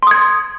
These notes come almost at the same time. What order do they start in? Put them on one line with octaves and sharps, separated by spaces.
C6 D#6 G#6